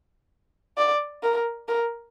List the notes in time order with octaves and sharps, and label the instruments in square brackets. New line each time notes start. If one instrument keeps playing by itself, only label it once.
[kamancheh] D5
A#4
A#4